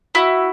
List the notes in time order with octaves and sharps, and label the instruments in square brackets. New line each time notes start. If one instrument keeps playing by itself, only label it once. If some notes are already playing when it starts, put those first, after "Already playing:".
[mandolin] E4 [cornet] F#4